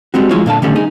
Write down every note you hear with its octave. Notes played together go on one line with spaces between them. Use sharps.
G3 G#3 C4 F#4
F3 F#3 G#3 E4 F4 C#5
A#2 D3 F5 A5
D3 D#3 G3 A3 C#4
D#4 G#4